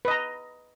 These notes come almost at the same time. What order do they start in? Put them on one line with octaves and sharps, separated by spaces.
B4 D#5 A#5